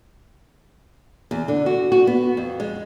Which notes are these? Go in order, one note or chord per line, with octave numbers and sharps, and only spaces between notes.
E2
D3
F#4
F#4
B3
F2
G#3